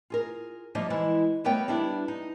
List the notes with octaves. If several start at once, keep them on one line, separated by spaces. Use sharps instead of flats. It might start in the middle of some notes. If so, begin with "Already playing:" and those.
F4 G#4 A#4
F3 G3 A#3 D#4 D#5 E5
E3 G#3 E4
G3 A3 B3 A#4 C#5 G5
G3 B3 D4 E4
D#4